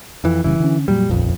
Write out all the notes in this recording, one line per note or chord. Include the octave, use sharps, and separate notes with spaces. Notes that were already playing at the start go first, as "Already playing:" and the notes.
F2 E3
F#1 C#3 E3 G3
D3 C#4
F2 A#2 F#3 G3
D#1 A#1 F2